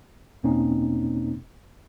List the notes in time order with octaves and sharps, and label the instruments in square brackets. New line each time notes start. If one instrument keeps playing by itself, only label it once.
[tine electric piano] E2 B2 A#3 C4 C#4 D#4